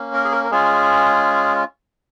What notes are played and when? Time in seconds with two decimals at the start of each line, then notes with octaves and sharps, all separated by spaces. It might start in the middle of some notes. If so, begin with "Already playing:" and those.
Already playing: A#3 C#4
0.14 A#4
0.25 G#4
0.32 A#4
0.44 A#4
0.51 G#3 C#4 F4 G#4